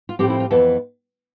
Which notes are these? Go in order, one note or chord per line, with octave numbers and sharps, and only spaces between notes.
F4
A2 F3 C4 G4
E4
F4
F2 E3 B3 A4